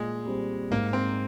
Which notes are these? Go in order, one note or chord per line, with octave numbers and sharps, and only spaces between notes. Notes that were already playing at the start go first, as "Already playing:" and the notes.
Already playing: A#2 G#3
G3 C4
G#2 A#3
C4